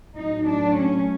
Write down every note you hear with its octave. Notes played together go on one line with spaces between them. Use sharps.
A2 F#3 D#4
D4
C#4